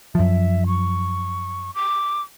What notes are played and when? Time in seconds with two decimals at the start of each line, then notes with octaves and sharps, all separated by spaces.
0.15 F#2 F3 E5
0.67 C#6
1.75 D6